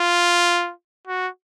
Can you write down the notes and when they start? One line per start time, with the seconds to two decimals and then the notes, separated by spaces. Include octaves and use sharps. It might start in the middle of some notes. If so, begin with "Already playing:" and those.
Already playing: F4
1.07 F#4